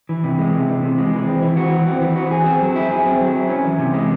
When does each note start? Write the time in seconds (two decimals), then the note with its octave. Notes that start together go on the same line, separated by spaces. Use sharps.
0.09 E3
0.24 C3
0.39 G#3
0.54 C3
0.68 E3
0.83 C3
0.98 G#3
1.13 E3
1.27 C4
1.42 E3
1.57 F#4
1.72 E3
1.86 C4
2.01 E3
2.16 F#4
2.31 G#4
2.46 C4
2.61 F#3
2.76 E4
2.91 G#4
3.06 C4
3.21 F#3
3.35 E4
3.49 C#4
3.65 E3
3.79 C3
3.94 G#3